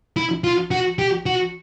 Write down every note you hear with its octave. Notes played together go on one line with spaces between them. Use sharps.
E4
F4
F#4
G4
F#4